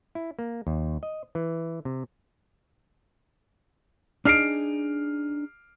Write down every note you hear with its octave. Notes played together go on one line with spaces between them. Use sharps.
E4
A#3
D#2
D#5
E3
C3
D4 D#4 G#4 F6 C7 D7